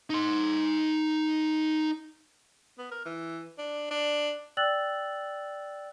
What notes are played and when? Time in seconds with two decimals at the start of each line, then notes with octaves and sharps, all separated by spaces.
0.10 D#4 C6
2.78 B3
2.92 A#4
3.06 E3
3.58 D4
3.91 D4
4.57 D5 G5 E6 F#6 A6 F#7